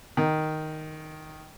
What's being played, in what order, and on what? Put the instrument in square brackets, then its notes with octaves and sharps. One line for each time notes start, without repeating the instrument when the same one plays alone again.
[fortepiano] D#3